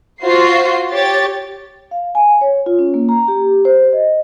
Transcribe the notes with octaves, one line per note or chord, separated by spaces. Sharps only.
F4 F#4 C5 C7
G4 C#5 A6
F5
G#5
C#5
F4
C#4
A#3
A#5
G4
C5
D#5